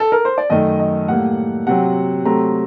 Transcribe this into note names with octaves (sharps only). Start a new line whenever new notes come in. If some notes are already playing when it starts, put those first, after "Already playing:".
A4
A#4
C5
D5
F#2 D#3 A3 D#5
D#5
A2 G3 A#3 F#5
C3 F#3 C4 F#5
C3 F#3 A3 C4 A#5